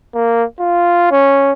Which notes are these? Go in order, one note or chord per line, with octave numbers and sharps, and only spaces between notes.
A#3
F4
C#4